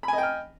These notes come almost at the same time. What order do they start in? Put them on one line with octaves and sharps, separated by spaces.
B5 G#5 D#5 G5 F6